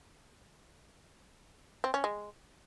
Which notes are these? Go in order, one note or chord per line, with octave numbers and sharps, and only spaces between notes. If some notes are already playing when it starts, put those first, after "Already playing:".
C4
C#4
G#3